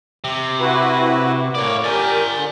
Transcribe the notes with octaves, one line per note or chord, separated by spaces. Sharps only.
C3
E4 F#4 B4
A2 A#3 C#5 D5
G4 A#4 D5 G#5
D3